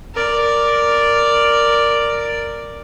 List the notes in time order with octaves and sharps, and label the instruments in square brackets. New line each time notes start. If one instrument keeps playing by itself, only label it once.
[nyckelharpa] A#4 D5